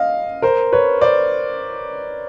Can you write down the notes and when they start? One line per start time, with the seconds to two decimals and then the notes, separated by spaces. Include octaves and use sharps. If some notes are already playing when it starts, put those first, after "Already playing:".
Already playing: D#5 F5
0.42 A#4 C5
0.72 B4 C#5
1.01 C5 D5